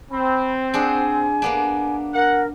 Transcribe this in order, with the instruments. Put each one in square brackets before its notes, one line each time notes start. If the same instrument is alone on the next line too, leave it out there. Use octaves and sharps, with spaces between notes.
[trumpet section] C4 [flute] B5
[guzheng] D4 G#4 F#5 [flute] G#5
[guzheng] A#3 B3 D4
[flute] A#4 [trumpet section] F#5